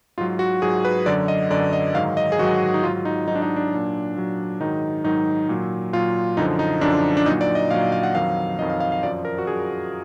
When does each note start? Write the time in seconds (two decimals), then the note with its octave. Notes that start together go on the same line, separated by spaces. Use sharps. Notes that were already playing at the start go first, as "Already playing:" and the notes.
0.18 G#2 F4
0.21 F#3
0.39 F#4
0.62 G#2 F#3 G#4
0.85 B4
1.06 F#2 D3 F#3 D5
1.28 D#5
1.50 F#2 D3 F#3 D5
1.73 D#5
1.94 G#2 D#3 F#3 F5
2.17 D#5
2.32 G#4
2.39 G#2 D#3 F#3 F#4
2.74 D#4
2.83 G#2 F4
2.86 F#3
3.05 D#4
3.27 G#2 F#3 D#4
3.35 D4
3.42 D#4
3.56 D4
3.71 A#2 F#3
4.16 A#2 F#3
4.61 G#2 D#3 F#3 D#4
5.04 G#2 D#3 F#3 D#4
5.49 A#2 F#3
5.93 A#2 F#3 F4
6.37 F#2 D3 F3 D#4
6.59 D#4
6.81 F#2 D3 F3 D4
7.17 D4
7.26 A#2 F#3 D#4
7.41 D5
7.55 D#5
7.70 A#2 F5
7.74 F#3
7.92 F5
8.03 F#5
8.14 F2 D#3 F#3 F5
8.59 F2 D#3 F#3 D#5
8.70 F5
8.80 F5
8.92 F5
9.03 F#2 F3 D5
9.25 A#4
9.38 F#4
9.47 F#2 F3 G#4